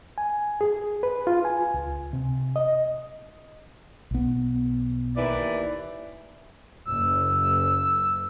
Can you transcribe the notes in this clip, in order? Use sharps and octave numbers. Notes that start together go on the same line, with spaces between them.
G#5
G#4
B4
F4
G#5
C#2
C3
D#5
B1 B3
D#2 E3 D5
F#1 E6